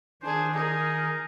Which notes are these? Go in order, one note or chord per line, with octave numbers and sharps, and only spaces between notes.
D#3 D4 G#4 C5 G#5
D#4 G#4 A#4